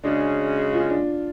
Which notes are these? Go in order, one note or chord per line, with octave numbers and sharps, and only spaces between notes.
C#3 G#3 C#4 D4 F#4
F4
D4